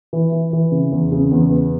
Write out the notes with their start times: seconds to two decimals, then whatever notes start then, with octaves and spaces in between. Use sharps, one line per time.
0.13 E3
0.32 E3
0.53 E3
0.72 C#3
0.91 E2
1.12 C#3
1.31 E2
1.51 B3